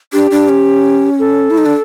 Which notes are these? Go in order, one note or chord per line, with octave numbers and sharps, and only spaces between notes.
D4 G4
D4
C#4
A4
E4
D#4
D4